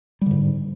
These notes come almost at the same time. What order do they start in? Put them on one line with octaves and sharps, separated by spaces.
G3 D3 G#2